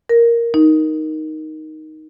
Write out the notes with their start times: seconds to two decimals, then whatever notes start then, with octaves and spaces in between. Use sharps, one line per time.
0.09 A#4
0.54 D#4